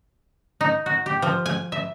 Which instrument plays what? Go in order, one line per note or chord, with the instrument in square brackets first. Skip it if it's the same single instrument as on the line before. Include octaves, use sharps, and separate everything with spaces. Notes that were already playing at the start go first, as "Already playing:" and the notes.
[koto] D#4
F#4
G4
F3
G#5
E5